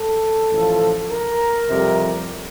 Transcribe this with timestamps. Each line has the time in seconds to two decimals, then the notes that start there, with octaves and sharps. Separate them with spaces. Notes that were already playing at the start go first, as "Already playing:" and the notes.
Already playing: A4
0.51 A1 A2 F3
1.11 A#4
1.69 F2 C3 G3